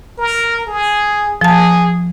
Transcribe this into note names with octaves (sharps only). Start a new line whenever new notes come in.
A#4
G#4
F3 G#4 A5